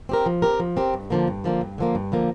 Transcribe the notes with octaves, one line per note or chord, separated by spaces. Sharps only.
C4 G4 A#4
F3
C4 G4 A#4
F3
C4 G4 A#4
G2
D3 F3 A#3
G2
D3 F3 A#3
G2
D3 F3 A#3
G2
D3 F3 A#3